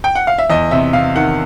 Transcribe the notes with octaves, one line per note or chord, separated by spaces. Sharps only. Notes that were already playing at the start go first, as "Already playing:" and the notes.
G5
F#5
F5
E5
E2 D#5
C3 E5
C3 F5
D#3 F#5